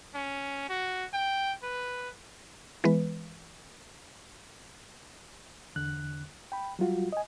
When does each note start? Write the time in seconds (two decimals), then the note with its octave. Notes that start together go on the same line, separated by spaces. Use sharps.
0.15 C#4
0.69 F#4
1.14 G5
1.63 B4
2.84 E3 G#3 B3 B4
5.76 E2 D3 F#6
6.52 G5 B5
6.79 F#3 G3 F4 F#4
7.12 D#5 G#5